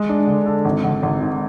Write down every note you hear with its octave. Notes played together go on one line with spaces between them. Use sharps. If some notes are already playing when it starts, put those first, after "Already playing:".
Already playing: G#3
D4
D3
A4
G#1
G#1
G#1
G#2